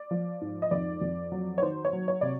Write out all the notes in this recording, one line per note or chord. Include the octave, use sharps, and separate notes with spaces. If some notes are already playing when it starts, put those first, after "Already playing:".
Already playing: D5
F3
G#2
D#5
F2 D5
F2
F#3
C#5
D#3 C5
C#5
F#3
C#5
C3 D5